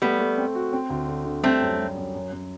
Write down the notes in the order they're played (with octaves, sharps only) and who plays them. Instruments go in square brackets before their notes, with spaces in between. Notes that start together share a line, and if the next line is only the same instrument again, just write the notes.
[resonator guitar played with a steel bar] G3 B3 [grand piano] A3
[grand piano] A3
C4
F#4
C4
D2
D3
D3
[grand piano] G3 [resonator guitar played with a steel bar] A3 C4
[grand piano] F#2
G3
F#2
F#2
F#2